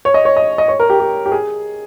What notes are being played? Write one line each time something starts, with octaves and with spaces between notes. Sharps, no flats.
C#5
D#5
C#5
D#5
D#5
C#5
A#4
G4
G4
G4
G#4